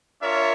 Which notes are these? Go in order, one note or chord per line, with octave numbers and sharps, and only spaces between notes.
D4 F4 A#4 C#5 E5